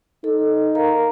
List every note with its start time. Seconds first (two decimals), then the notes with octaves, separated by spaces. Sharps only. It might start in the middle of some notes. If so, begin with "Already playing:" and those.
0.24 D#4 A4
0.75 A#4 F5 A#5